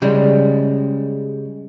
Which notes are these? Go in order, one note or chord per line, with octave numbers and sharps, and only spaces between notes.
C#3 G3 G#3